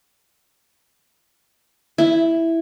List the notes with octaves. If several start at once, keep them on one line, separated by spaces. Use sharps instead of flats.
E4